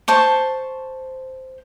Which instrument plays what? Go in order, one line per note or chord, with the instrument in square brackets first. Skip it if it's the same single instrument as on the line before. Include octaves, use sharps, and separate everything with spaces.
[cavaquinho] C5 A5 C#6